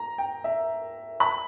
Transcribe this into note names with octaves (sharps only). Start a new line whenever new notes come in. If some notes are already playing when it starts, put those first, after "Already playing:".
Already playing: A#5
G5
E5
B5